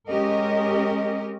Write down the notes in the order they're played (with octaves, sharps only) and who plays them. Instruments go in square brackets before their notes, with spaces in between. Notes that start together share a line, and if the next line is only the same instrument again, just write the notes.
[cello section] G#3 C#4 G4 A#4 D#5